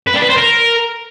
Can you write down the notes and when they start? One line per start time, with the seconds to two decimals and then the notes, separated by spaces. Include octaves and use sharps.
0.07 B4
0.14 D4
0.22 B4
0.29 C5
0.37 A#4